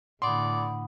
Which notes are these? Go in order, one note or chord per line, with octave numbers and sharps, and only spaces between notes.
E2 A2 D3 D5 F#5 B5 C6 D#6